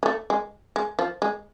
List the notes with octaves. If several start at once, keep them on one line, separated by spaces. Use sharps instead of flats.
G#3
A3
G#3
G#3
F3
G#3